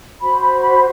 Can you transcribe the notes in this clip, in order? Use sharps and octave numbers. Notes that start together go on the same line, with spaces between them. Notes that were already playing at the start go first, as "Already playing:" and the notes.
F#4 C5 B5
B5
B5